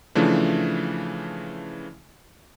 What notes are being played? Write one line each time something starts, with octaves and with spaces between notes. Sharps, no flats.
C#3 E3 F3 A3 D4